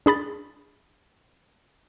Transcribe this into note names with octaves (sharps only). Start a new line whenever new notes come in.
D4 G#4 B5 A6